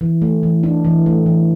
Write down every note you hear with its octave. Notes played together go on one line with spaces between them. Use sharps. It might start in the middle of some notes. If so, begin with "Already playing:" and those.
E3
A3
E3
D4
E3
A3
E3